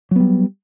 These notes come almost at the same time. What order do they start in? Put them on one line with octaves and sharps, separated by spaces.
F#3 B3 G3